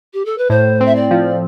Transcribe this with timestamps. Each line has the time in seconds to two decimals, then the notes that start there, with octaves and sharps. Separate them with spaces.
0.13 G4
0.25 A4
0.37 B4
0.50 A2 C5
0.81 C4 E5
0.95 D5
1.11 F3